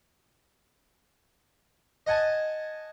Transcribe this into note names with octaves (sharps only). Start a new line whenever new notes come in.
D#5 F#5 G#5 A5